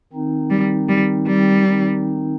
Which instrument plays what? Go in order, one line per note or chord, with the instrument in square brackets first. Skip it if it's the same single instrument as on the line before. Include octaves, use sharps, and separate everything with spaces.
[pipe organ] D#3 C4 D#4
[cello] G3
G3
G3
[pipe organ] D#3 C4 D#4